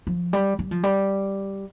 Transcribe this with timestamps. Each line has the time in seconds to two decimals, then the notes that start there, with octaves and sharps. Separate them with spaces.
0.07 F3
0.33 G3
0.59 G3
0.71 F3
0.83 G3